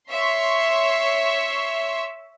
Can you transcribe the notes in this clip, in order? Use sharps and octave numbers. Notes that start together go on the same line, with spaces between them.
C#5 E5 C6 C#6